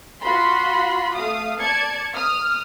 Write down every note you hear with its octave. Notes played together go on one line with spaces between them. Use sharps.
F4 F#4 B5 C6
A3 F5 D#6
D5 A5 G#6 C#7
D#6 F6